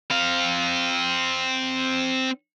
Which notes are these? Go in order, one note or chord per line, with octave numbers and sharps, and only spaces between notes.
C4 F5